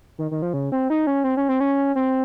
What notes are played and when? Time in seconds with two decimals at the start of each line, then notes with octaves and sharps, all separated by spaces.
0.18 D#3
0.31 D#3
0.42 F3
0.53 C#3
0.72 C4
0.90 D#4
1.07 C#4
1.24 C4
1.37 C#4
1.49 C4
1.60 C#4
1.95 C4